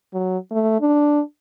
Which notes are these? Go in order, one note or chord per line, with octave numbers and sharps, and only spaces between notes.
F#3
A3
D4